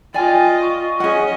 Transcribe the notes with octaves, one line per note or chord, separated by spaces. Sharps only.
F4 D5 D#5 G5 G#5
C#6
C#4 G#4 D#5 F#5